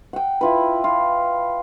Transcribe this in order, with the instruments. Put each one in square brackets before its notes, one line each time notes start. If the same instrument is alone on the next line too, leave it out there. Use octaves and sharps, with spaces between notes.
[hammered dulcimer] F#5 G5
E4 F4 B4
F4